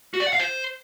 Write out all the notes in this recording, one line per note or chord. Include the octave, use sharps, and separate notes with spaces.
F#4
D5
F#5
F5
C5